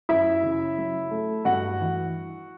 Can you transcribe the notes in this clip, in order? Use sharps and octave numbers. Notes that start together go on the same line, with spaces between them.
F#2 E4 E5
C#3
F#3
A3
G2 F#4 F#5
E3